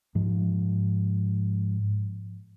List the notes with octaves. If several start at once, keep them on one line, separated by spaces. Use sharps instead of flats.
G#2 F3